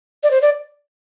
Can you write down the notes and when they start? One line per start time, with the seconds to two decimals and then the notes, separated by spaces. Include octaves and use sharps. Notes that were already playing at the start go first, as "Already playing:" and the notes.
0.23 D5
0.31 C5
0.42 D5